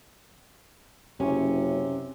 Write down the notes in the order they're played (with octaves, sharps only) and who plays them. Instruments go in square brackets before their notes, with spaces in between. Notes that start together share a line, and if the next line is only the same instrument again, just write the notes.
[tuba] F#1 [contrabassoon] C3 [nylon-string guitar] C#4